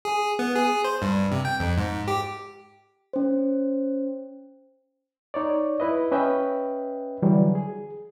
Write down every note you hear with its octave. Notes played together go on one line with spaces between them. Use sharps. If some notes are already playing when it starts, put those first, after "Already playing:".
G#4
B3
G#4
C5
G2
C3
G5
F2
G#2
G4
C#4 C5
D#4 C#5 D5
E4 B4 D#5
C#4 B4 D#5 E5 G5
D3 E3 F#3 G3
G#4